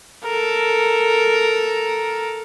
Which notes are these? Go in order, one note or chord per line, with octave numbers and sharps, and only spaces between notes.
A4 A#4